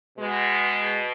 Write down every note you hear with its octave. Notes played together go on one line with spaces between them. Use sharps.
B2 G#3